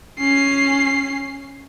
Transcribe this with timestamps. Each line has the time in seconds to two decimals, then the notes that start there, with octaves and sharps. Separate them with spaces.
0.19 C#4 C7